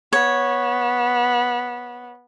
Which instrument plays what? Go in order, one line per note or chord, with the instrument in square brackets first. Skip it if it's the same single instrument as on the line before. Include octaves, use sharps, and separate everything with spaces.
[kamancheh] B3 [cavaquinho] C#5